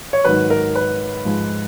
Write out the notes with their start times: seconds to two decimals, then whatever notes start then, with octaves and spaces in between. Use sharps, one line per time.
0.13 C#5
0.24 G#2 D#3 F#3 B4
0.50 A#4
0.75 B4
1.25 G#2 F3 G#3